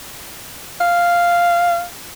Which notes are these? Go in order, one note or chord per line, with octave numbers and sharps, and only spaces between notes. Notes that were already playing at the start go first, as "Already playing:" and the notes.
F5